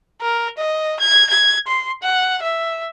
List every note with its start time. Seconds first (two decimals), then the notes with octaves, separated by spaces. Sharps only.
0.22 A#4
0.58 D#5
1.00 G#6
1.30 G#6
1.67 C6
2.02 F#5
2.43 E5